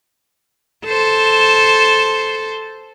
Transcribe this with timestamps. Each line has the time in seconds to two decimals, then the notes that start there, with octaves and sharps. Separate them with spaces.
0.86 A4 C5